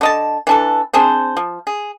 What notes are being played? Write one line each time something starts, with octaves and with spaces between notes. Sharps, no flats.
D3 D#5 A5
E3 D4 A4
C4 D4 G#4 C5
F3
G#4